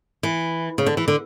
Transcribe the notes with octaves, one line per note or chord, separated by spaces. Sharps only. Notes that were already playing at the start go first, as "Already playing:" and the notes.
E3
C#3
D3
E3
D3